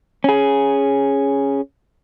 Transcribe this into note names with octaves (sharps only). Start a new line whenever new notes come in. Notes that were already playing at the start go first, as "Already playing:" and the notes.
C#4 G#4